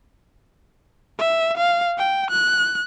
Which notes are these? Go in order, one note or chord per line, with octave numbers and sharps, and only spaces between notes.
E5
F5
G5
F#6